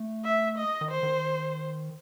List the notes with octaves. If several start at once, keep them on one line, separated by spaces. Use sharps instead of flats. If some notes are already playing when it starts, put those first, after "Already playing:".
Already playing: A3
E5
D#5
D#3
C5
D#3